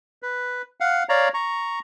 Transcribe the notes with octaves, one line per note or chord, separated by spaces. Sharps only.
B4
F5 F#5
C#5 D5 F5 A#5
A#5 C#6